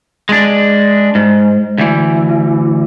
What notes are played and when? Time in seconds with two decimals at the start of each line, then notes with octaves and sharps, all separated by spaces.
0.29 G#3 D4
1.15 G#2
1.78 D2 E3